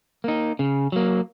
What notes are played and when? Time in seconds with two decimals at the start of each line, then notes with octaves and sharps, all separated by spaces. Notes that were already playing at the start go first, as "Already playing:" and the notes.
0.24 A#3 D#4
0.59 C#3
0.92 F#3 A#3